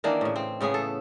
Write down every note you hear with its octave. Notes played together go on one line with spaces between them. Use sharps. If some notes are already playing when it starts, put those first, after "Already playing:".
D#3 E3 A#3 D4
A2 C#3
C4
A2 C#3 B3 G#4
A4